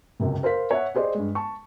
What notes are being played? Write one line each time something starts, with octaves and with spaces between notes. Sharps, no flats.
C#2 F#2 C3
A#4 C5 F5 B6
C#5 E5 F#5
G4 G#4 C5 D5 D#5
G2 G#3
A5 C#6